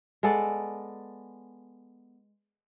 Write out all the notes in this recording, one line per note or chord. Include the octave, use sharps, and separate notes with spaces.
G#3 B3 A4 D5